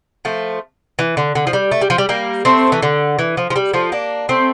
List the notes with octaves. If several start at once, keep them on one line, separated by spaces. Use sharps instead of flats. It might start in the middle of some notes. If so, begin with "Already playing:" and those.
F3 A3
E3
D3
D3
F3
G3
A3
G3
F3
G3
G3 A#3
A3 C4
E3
D3
E3
F3
F3
G3
F3 A3
A#3 D4
A3 C4